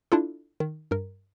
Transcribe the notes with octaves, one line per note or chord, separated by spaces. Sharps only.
D4 E4 F4 A4
D#3
G2 A#4